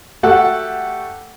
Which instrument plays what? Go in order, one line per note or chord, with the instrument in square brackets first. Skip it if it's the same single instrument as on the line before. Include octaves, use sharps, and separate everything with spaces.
[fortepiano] A3 F#4 G4 A4 F#5